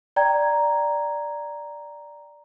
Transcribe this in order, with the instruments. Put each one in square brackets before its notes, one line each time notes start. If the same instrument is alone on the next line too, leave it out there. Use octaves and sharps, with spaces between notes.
[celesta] D5 G5 A#5 G#6